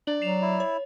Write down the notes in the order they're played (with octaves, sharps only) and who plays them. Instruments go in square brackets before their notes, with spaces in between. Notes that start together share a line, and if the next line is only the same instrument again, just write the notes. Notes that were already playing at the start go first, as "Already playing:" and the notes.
[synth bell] D4 F#7 [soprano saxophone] D5
[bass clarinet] F#3 [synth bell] C7 E7 F7
[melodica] E4
[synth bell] C#5